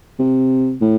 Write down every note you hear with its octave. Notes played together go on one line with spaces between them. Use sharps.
C3
A2